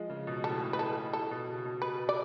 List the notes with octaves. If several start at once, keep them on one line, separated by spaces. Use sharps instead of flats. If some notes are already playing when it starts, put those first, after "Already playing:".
Already playing: F3 G#3
C#3
B2
A2 A4
A2
B4
A2 A4
A2
A4
B2
C#3
B2
B2 B4
D5